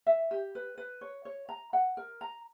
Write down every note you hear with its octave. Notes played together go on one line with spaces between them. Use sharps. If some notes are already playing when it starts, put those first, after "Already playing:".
E5
G4
B4
B4
C#5
C#5
A#5
F#5
A#4
A#5